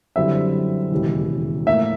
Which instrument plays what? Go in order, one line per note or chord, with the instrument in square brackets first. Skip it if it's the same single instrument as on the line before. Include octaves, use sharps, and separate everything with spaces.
[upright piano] F#2 D3 G3 C4 E4 [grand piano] E5
[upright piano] E1 D#2 C#3 E3
[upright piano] A2 F3 A#3 [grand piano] E5